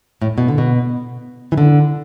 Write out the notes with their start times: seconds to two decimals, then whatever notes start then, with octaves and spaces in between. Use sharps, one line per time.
0.22 A2
0.38 B2
0.48 D3
0.58 B2
1.52 E3
1.58 D3